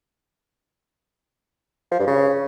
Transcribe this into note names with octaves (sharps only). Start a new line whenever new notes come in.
F3
G2
C#3